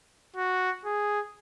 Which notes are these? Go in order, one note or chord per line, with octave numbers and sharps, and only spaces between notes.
F#4
G#4